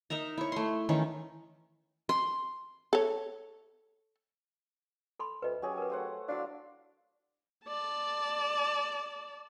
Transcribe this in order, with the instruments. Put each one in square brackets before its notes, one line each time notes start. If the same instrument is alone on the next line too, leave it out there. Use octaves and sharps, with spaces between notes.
[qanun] D#4 A#4 E5 A#5
E4 C#5
A3 C6
D#3 E3 C#4
C6
[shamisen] A4 C#5
[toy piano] A4 B5 C6
[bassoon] D2 [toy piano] B4 D#5
[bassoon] F#3 [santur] C#4 G4 G#4
[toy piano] A#4 B4
[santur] A3 C5 F#5
[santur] F#3 E4 F5 [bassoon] D4
[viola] D5 A5